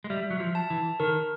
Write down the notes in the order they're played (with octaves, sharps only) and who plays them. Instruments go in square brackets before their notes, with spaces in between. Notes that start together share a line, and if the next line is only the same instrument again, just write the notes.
[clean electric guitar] G#3
[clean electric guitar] G3 [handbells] E5
[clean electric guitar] F#3
F3
[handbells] A5
[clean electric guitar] E3
[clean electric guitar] D#3 [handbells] A#4